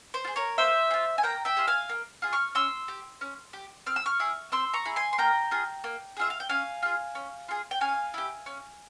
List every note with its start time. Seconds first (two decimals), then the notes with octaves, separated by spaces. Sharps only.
0.14 C5
0.24 F4
0.28 G#4
0.36 A#4 C#5
0.58 A#3 C5 E5
0.91 G#4
0.94 F4
1.18 G#5
1.23 A#3 G5 A#5
1.45 E5 G5
1.57 F4 G#4
1.67 F5 G#5
1.89 A#3
2.22 F4 G#4
2.33 C#6 F6
2.55 C#4 C6 E6
2.88 G4
3.21 C#4
3.53 G4
3.86 C4 F6
3.96 E6
4.06 C#6 F6
4.20 E4 G#4
4.52 C4 C6 E6
4.74 A#5 C#6
4.85 E4 G#4
4.96 G#5 C6
5.13 C6
5.18 A#3 G5 A#5
5.51 F4 G#4
5.84 A#3
6.17 F4 G#4 E5
6.30 F5
6.40 G5
6.49 C#4 F5 G#5
6.82 F4 G#4
7.15 C#4
7.49 F4 G#4
7.71 G5
7.81 C#4 F5 G#5
8.14 E4 G4
8.46 C#4